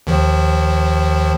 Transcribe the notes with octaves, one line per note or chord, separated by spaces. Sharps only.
D#2 D#3 F3